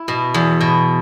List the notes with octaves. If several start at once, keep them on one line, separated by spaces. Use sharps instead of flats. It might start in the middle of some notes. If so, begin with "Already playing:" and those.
Already playing: E4
B2
E2
B2